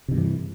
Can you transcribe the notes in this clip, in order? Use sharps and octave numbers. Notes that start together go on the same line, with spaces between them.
G2 C3 D#3 E3